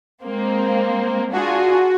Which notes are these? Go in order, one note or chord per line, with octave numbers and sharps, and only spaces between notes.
G#3 A#3 C4
D4 F4 F#4 G#4